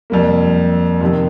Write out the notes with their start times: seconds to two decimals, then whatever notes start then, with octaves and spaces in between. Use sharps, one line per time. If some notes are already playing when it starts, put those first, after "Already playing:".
0.10 F2 C3 G3 A#3
1.01 F2 C3 D#3